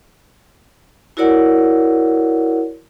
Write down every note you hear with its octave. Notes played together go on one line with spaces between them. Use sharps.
E4 F#4 A#4 C#5 D5 F#5